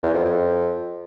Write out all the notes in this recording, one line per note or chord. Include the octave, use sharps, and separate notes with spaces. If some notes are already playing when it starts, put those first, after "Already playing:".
E2
F2
F2